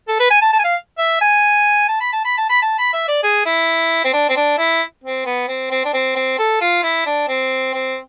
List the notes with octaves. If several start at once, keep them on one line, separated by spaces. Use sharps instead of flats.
A4
B4
G#5
A5
A5
G#5
F5
E5
G#5
A5
B5
A5
B5
A5
B5
A5
B5
E5
D5
G#4
E4
C4
D4
C4
D4
E4
C4
B3
C4
C4
D4
C4
C4
A4
F4
E4
D4
C4
C4